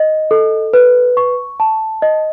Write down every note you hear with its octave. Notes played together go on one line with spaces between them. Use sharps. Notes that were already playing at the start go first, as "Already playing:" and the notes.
Already playing: D#5
A4
B4
C#6
A5
D#5